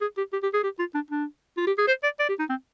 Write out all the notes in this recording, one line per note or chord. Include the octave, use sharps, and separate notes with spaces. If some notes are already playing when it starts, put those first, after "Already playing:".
G#4
G4
G4
G4
G#4
G4
F4
D4
D4
F4
G4
G#4
C5
D5
D5
G4
D#4
C4